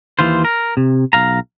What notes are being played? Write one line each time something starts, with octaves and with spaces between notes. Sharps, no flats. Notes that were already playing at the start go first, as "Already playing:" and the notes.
D#2 E3 F4 C5
A#4
C3
B1 F5 A#5